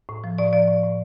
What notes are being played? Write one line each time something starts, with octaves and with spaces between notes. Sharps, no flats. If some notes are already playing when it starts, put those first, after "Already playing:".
A2
F3
A2 D5
F3 D5
A2
A2